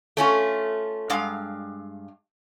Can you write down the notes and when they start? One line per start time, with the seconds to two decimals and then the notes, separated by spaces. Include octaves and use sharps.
0.17 A3 C#4 F4
1.10 G2 G#3 F5